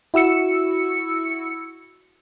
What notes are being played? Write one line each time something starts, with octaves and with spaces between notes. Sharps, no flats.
E4 F#4 E6 C#7